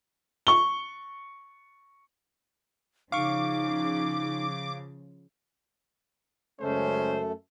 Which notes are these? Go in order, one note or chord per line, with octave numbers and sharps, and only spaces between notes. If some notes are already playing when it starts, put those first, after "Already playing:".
C#6 G7
C#3 F3 D#4 F5 C#6 D6
F#2 C#3 G#3 A3 C#4 A4 C5